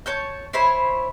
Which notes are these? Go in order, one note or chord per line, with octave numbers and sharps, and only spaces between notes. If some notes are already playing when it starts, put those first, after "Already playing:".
C#5 A5 G6
E4 C5 C#5 B5